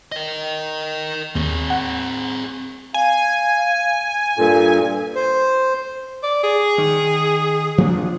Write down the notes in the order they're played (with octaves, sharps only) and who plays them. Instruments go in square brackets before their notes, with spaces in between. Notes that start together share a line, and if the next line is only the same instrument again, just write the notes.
[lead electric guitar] A#4 D#5
[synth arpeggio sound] D#2 [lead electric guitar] C4 G#4
[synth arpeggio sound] F#5
[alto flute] F5 [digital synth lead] G#5
[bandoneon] G2 A#2 [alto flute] A4
[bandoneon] C5
[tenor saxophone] D5
G#4
[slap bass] D#3
F3 A#3 D4